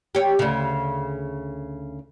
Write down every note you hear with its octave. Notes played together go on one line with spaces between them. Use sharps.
G4 C#5
D2 C#3